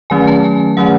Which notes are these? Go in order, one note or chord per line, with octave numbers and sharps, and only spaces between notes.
D#3 F#3 A3 C#4 G#5
A5
G#5
D#3 F#3 A3 C#4 F#5